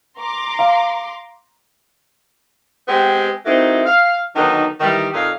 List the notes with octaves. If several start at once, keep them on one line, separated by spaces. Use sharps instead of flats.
A#5 C6 D6
F5
G#3 B3 C4 G4
F#3 A3 A#3 C4 D#4 E4
F5
D3 D#3 F#3 B3 D#4
D#3 E3 G3
F2 A#2 D#4 F5